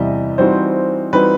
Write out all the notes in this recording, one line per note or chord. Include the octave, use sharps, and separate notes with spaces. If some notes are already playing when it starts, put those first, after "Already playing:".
Already playing: E2 C3 E3 G3 D#5 E5
E3 G3 C4 D#4 F#4 C5
E3 G3 C4 D#4 F#4 B4